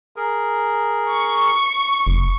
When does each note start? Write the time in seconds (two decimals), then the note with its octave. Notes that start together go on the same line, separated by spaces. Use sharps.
0.16 G#4 A#4
1.11 C#6
2.07 F#1